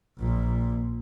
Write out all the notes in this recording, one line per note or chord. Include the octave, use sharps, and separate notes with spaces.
A#1 A#2